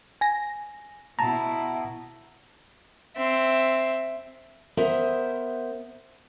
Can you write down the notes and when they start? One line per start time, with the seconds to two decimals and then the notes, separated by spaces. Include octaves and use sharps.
0.21 G#5 A#6
1.19 B2 E4 A5 A#5
3.16 C4 E5
4.77 B3 A#4 C5 E5